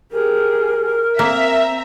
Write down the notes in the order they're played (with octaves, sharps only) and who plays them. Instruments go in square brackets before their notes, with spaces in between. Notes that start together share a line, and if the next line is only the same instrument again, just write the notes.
[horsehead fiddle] G4 G#4 [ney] A#4
[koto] A#3 [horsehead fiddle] C4 [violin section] E5 A#5